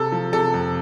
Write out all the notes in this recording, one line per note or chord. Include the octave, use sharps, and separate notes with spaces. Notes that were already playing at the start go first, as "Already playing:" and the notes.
Already playing: C3 A4
F3
C3 A4
F2